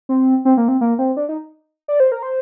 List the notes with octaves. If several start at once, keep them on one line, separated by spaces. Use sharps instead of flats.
C4
C4
A#3
C4
A#3
C4
D4
D#4
D5
C5
A#4
C5